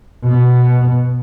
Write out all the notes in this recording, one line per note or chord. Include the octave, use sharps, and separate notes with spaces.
B2 B3